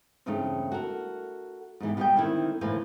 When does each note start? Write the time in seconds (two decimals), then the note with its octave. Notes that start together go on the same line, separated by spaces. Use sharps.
0.26 E2 G2 C#3 A3 C4 D#4
0.72 F#4 A4 A#4
1.80 G#2 B2 E3 G3
1.97 B2 G3 F4 B4 D#5 G5
2.16 D3 D#3 C4 D#4 E4
2.61 D2 A2 E3 A#3 B4 C5